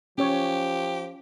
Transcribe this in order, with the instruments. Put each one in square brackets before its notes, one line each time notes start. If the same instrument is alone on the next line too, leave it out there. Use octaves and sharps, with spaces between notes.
[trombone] F3 [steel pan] C#4 C#5 [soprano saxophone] G4